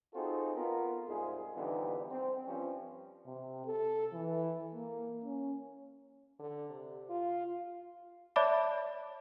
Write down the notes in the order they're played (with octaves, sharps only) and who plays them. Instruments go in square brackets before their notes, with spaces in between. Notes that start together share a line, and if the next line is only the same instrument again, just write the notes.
[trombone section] C4 D#4 F4 F#4 G#4 A4
B3 F4 A#4
C2 G#2 F4 G#4
F2 D3 E3 G3 B3 D#4
C4
G2 F3 C4 C#4
[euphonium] C3
A4
E3
A#3
C#4
[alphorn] D3
C3
F4
[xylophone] C#5 D5 E5 A5 B5 D6